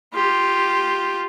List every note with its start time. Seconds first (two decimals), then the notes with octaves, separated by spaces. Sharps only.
0.14 F4 G4